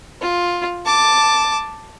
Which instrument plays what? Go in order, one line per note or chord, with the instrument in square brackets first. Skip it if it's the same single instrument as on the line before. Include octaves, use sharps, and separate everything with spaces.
[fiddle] F4
A5 D6